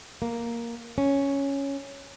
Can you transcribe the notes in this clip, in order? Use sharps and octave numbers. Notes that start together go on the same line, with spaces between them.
A#3
C#4